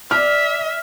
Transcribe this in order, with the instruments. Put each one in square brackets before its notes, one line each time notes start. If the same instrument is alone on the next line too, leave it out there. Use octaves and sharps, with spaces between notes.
[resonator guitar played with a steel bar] D5 [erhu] E5 [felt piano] F6